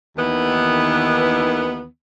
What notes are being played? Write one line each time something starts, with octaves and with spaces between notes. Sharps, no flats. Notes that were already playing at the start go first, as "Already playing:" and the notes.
D#2 D#3 E3 B3